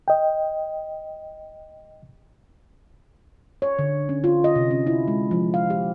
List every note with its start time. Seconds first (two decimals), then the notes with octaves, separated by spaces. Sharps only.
0.08 D#5 G5
3.62 C#5
3.79 D3
4.09 C#4
4.24 F4
4.44 D#5
4.56 C3
4.71 C#4
4.87 E4
5.08 G#3
5.31 F3
5.54 F5
5.70 G4